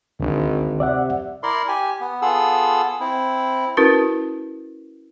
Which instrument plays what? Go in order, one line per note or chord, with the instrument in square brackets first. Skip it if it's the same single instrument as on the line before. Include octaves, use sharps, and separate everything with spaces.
[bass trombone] G#1 [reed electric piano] D2 D3
[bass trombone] C3 [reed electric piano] D5 E5 F#5
[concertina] E4 A#4 D5 C6
G4 G#5
B3
B3 F4 G#4 A4 E6
C4 E4
[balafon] C#4 E4 F#4 A#4 B4